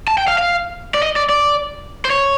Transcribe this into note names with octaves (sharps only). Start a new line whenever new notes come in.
A5
G5
F5
F5
D5
D#5
D5
D5
C5
C#5